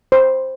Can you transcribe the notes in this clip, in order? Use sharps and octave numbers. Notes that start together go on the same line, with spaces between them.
C5